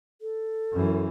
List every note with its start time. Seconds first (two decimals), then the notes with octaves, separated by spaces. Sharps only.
0.21 A4
0.73 F#2 E3